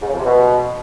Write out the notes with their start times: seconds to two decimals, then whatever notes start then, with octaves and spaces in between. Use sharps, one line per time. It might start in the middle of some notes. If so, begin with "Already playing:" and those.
0.01 G#2
0.07 C#3
0.13 F2
0.18 C3
0.24 B2